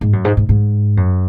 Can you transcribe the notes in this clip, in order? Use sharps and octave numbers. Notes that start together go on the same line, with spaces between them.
G#2
F#2
G#2
G#2
G#2
F#2